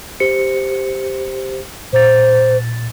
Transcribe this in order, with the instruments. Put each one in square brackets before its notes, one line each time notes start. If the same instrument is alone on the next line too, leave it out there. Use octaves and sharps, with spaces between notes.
[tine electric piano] G4 C5 C#7
[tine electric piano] A#2 A6 [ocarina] C5